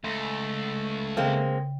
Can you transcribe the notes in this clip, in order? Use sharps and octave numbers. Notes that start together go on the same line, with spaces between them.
C#2 A3
C#3 G#3 A#3 C4 G5